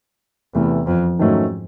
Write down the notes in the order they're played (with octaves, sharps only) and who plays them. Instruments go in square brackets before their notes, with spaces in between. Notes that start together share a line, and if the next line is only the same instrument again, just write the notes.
[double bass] E2 [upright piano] C3 E3 A3
[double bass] F2
[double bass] G#2 [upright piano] D#3 F#3 A3 C#4